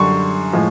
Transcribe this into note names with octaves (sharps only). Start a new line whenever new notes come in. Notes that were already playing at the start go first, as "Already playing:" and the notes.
Already playing: F#2 D3 G3 C6 C#6
A2 F3 G#3